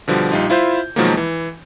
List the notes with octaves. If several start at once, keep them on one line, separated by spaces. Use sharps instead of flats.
B2 D3 F3 G3
A#1 G3 D#4 F4
E4 F4 C5 E5 G6
B2 D#3 F3 F#3 G#3 A#3
E3